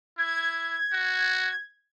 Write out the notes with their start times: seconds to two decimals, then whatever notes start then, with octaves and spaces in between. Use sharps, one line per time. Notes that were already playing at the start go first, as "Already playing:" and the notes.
0.18 E4 G#6
0.92 F#4